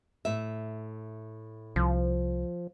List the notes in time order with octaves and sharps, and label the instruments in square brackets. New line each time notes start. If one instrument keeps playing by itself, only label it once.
[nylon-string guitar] A2 E5
[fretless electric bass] C2 [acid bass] F3